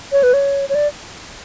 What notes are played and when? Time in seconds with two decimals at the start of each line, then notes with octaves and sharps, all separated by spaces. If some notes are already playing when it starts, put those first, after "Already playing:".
0.12 C#5
0.23 B4
0.34 C#5
0.69 C#5
0.75 D5